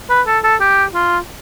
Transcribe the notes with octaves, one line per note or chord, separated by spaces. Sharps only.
B4
A4
A4
G4
F4